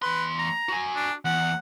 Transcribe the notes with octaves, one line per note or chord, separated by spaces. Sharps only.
E2 B4 C6
A#5
F#4 G#5
D4
E2 F#5